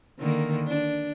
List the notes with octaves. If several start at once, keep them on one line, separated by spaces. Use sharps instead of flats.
D3 D#3 A#3
D4